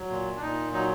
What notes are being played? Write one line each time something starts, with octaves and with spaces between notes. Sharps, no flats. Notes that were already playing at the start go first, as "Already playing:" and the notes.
Already playing: F#3
A#2
D4
A#2 D#4
F#3 D#4